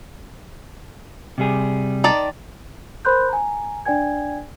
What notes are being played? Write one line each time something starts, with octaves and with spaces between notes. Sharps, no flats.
C3 G3 G#4
D#3 D5 A5
A#4 C5 B5 C6 F#6 G6
G#5 A#5
D4 D5 G5 G#5 G#6